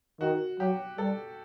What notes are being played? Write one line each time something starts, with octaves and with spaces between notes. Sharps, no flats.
D#3 F#4
F#3 G4
G3 A4